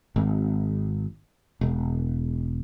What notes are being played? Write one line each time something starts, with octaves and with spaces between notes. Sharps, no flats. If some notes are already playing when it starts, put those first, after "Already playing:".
G#1
E1